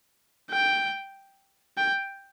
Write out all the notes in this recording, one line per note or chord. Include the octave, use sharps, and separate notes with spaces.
G5
G5